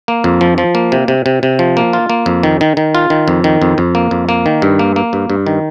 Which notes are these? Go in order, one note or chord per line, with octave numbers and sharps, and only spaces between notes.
A#3
F2
F3
F3
A#3
C3
C3
C3
C3
F3
A#3
F4
A#3
F2
D#3
D#3
D#3
F4
D#3
F2
D#3
F2
F2
A#3
F2
A#3
D#3
G2
A#3
A#3
G2
G2
D#3